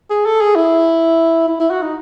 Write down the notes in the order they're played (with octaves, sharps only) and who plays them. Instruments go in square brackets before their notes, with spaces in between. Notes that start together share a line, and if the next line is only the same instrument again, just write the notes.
[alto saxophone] G#4
A4
G#4
E4
E4
E4
F#4
D#4